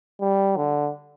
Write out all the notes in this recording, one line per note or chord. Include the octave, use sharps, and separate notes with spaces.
G3
D3